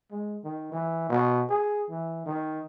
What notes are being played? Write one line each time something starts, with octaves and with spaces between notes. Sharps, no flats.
G#3
D#3
E3
B2
G#4
E3
D#3